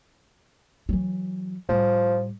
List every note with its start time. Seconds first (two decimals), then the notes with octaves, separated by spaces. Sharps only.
0.89 E3 F#3
1.69 A2 F3 G3